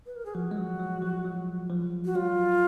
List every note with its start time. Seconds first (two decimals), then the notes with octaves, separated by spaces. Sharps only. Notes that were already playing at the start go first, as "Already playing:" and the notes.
0.06 B4
0.16 A#4
0.25 G#4
0.34 F3 F#4
0.51 G#3
0.57 F#3
0.79 F#3
1.02 F3
1.25 F#3
1.70 F3
2.05 F#4
2.15 F#3 F4